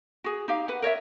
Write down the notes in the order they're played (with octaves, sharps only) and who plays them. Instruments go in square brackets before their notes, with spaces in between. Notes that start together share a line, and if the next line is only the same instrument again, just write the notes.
[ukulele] F#4 G#4
D#4 G4 F5
B4 F#5
A#4 C#5 D5 E5